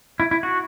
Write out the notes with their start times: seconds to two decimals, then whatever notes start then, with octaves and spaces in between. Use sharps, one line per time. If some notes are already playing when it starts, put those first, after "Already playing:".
0.20 E4
0.31 E4
0.43 F#4